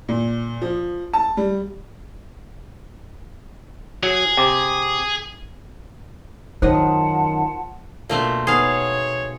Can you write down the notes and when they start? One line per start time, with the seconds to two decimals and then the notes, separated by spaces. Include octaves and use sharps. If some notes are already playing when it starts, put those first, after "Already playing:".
0.09 A#2
0.62 F3
1.13 A5
1.37 G3
4.03 F#3 G#4
4.37 C3 G5 D6
6.62 F#2 D#3 D#4 F4 C5 D#5 F#5 A5
8.09 B2 A3 A#3 C4 D4 F4
8.47 A3 B3 D#4 G#4 C#5 F5